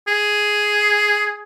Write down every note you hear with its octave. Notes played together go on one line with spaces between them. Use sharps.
G#4